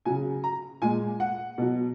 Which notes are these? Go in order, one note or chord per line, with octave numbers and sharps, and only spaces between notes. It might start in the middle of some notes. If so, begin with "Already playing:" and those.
C#3 F#3 G#5
A#5
A#2 G#3 G#5
F#5
B2 F#3